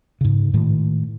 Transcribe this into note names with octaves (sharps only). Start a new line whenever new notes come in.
G#2 C#3
A2 D#3 G#3